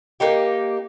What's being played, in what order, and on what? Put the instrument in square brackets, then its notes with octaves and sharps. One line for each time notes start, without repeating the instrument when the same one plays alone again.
[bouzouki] A#3 D#4 G4